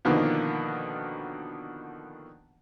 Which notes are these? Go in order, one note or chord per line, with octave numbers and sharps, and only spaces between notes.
B2 D3 D#3 F3 A#3 B3